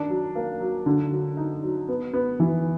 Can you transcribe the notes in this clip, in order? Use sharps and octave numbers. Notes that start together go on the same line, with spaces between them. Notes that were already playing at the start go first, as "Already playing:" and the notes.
Already playing: D#3 D4
F#3
A#3
F#3
D3
F#3
D#4
F#3
B3
B3
E3